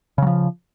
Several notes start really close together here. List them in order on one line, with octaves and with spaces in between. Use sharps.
C#3 F#3 F3